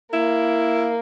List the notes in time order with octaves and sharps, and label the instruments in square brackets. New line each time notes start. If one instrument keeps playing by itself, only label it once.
[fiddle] A#3 [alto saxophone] E4